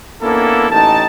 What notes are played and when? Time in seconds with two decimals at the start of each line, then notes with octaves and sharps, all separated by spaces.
0.22 A#3 B3 C#4 D4 E4 A4
0.71 A1 D#4 G5 A5